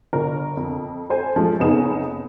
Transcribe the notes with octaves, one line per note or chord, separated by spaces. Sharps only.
G1 A#4
F2
A4 C5 G#5
F#2 F3 G#3 A3
F#1 F2 B3 D#4 G#4 E7